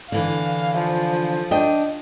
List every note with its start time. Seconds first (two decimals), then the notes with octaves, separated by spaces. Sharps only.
0.12 D3 E3 F5
0.78 F3
1.51 D4 D#5 G5